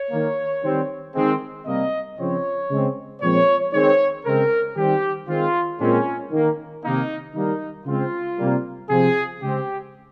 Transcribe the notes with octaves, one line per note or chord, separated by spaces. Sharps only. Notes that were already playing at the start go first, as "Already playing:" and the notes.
Already playing: C#5
D#3 A#3
D#3 G3 C4
D#3 G#3 C4
C3 G3 A#3 D#5
C#3 F3 C4 C#5
C#3 G#3 C4
A#2 F3 G#3 C4 C#5
D#3 G#3 C4 C#5
C#3 G#3 C4 A#4
D#3 G3 C4 G4
D#3 G#3 C4 F4
A#2 G#3 C4 C#4
D#3 A#3
C3 D#3 A#3 D#4
D#3 G3 A#3 D#4
C#3 G#3 C4 F4
C3 G3 A#3
C3 F3 C4 G#4
C#3 G#3 C4 G4